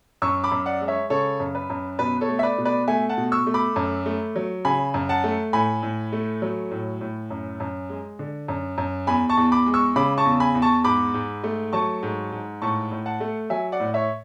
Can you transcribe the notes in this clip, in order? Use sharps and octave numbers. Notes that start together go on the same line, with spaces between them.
F#2 C#6 E6
B5 D6
F#2
D5 F#5
G#3
C#5 E5
C#3 A4 C#5
F#2
B4
F#2
B2 B4
A4 C#5
A3
E5
B4 D5
B2
B4 D5
A3 E5 G#5
F#5 A5
B2
C#6 E6
A3
B5 D6
F#2
A3
F#3
C#3 G#5 B5
F#2
F#5 A5
A3
A2 G#5 B5
A2
A3
F#3
A2
A2
F#2
F#2
G#3
D3
F#2
F#2
E2 G#5 B5
A5 C#6
E2
B5 D6
G#3
C#6 E6
C#3 B5 D6
A5 C#6
E2
G#5 B5
E2
A5 C#6
G#2 B5 D6
G#2
A3
F#3 A5 C#6
G#2
G#2
A2 A5 C#6
A2
F#5 A5
A3
F#3 E5 G#5
D5 F#5
A2
C#5 E5